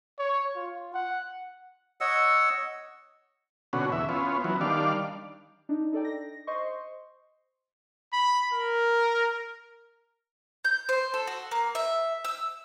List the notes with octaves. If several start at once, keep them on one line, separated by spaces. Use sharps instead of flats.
C#5
F4
F#5
C#5 D#5 F#5 E6
B2 D3 C#4 F#4
E2 E5
B3 C#4 F4
E3 F#3 B3
D#3 G3 D4 D5 F5
D4 D#4
D#4 A4 D5 G5
A#6
C5 D#5 C6 C#6
B5
A#4
G6
C5
A4
F#4
A#3
E5
E6